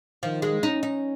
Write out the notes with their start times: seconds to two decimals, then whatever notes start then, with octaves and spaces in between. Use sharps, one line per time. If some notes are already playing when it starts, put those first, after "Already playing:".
0.23 D#3 F3
0.42 G#3
0.62 C#4 D#4
0.83 D#4